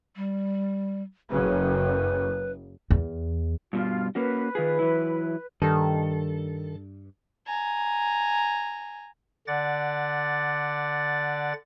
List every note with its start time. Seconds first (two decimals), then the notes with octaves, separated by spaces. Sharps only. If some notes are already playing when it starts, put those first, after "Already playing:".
0.16 G3
1.30 F#1 F#2 C#3 B4
2.91 E2
3.73 G2 B2 G3 F4
4.15 A#3 C#4 F#4 B4
4.55 D#3 F4 G#4
4.79 E3 F#3 E4
5.62 G2 D#3 A4
7.47 G#5 A#5
9.47 D3 D5 F#5 A6